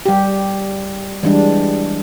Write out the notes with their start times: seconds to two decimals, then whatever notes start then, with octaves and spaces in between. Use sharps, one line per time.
0.06 G3 G4
1.23 E3 G3 G#3 D4